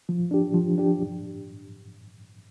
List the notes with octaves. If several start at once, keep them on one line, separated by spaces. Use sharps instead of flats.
F3
D4 G4
F3
D4 G4
G2